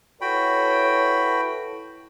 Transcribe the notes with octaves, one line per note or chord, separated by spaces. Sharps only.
E4 F#4 A4 B4 C#5 G5 B5